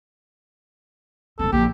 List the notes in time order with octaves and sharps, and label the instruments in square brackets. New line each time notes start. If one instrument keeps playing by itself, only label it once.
[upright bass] E1 C4 [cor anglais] A4
[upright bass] A#1 [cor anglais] G4